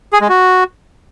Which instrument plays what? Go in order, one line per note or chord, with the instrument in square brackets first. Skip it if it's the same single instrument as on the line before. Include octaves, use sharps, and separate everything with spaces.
[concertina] G#4
G#3
F#4